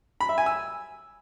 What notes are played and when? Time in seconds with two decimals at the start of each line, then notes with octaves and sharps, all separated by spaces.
0.20 B5
0.29 E5
0.38 G#5
0.46 E6